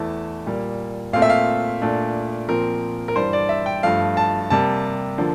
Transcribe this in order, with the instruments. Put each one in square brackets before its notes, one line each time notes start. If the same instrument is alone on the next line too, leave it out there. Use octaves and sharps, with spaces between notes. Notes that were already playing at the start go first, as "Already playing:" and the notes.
Already playing: [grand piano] E2 E3 A3 E4 A5
A#2 G3 A#3
A#2 A3 C4 F5
E5
F5
A#2 A3 D4
A#2 F3 C4 A#4
A#4
G2 E3 G3 D4 C5
D5
E5
G5
G2 F3 A3 F5
A5
C3 G3 A#3 A5
D3 F3 A#3 D4